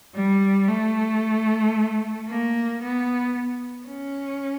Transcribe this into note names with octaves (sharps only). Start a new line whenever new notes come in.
G3
A3
A#3
B3
C#4